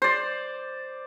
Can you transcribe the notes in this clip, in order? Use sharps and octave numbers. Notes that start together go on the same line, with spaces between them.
C5 D5